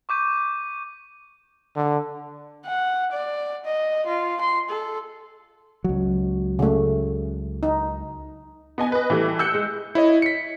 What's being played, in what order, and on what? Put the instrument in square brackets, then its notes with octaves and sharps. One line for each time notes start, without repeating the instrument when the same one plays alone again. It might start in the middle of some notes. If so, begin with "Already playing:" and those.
[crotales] C#6 D6 G6 D#7
[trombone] D3
[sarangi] F#5
D5
D#5
F4
C6
A4
[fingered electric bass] C#2 F#3
[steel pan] C#3 A3
D#4
[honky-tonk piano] B3 D#5 G#5
B4 D#5
E3 G3 A3
E6 F#6 G6 C#7
G#3
[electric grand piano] E4 C#5 D#5
B6 C#7